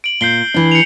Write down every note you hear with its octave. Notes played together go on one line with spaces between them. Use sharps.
D7 F#7
A#2 G6 C7 G7
E3 D4
C#7 F7